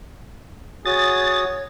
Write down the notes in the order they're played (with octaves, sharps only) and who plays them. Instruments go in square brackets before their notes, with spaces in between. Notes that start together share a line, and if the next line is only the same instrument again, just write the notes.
[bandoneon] F#4 D#6 [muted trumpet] G#4 [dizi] C#5 [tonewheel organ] A6